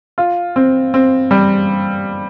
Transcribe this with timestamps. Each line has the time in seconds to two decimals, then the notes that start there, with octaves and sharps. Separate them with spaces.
0.18 F4
0.56 C4
0.94 C4
1.31 G3